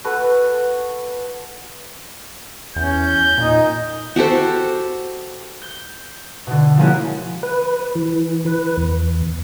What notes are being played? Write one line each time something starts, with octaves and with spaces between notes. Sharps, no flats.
F#4 A4 B4
E2 C#4 G6
A#2 D#4
F#4 G4 A4 C5
G6
B2 D3
F3 G#3 A#3 C#4 E4 F#4
B4
E3
B4
E2